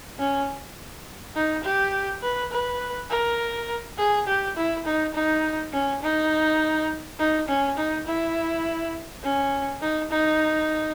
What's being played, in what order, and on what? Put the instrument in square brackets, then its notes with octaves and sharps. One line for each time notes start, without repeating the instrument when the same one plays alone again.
[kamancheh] C#4
D#4
G4
B4
B4
A#4
G#4
G4
E4
D#4
D#4
C#4
D#4
D#4
C#4
D#4
E4
C#4
D#4
D#4